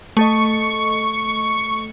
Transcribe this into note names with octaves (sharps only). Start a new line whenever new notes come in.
A3 A4 D#5 C#6